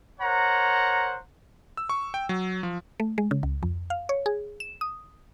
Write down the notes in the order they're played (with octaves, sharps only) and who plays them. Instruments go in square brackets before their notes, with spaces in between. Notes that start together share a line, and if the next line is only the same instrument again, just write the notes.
[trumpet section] A#4 C5 C#5 F#5 A#5
[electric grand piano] E6
C#6
G5
F#3
F3
[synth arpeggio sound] A3
G#3
C#3
C#2
F2
F5
C#5
G#4
E7
D#6